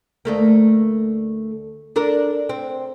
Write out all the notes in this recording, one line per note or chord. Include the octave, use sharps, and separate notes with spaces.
D2 A3 A#3
D4 A4 A#4
C4